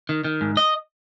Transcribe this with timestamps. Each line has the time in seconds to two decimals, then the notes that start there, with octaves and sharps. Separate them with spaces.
0.09 D#3
0.25 D#3
0.41 G#2
0.57 D#5